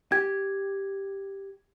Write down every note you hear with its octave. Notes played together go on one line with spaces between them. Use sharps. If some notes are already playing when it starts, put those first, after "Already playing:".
G4 G#6